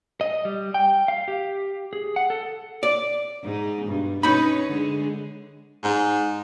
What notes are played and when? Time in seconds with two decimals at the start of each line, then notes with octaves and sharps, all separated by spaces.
0.21 D#5
0.45 G3
0.74 G5
1.08 F5
1.28 G4
1.93 G#4
2.16 F#5
2.30 A4
2.83 D5
3.42 G#2 D#4
3.85 G2 B2
4.23 C#4 D#4 B4 C#5 B5
4.67 D3 G#3
5.83 G#2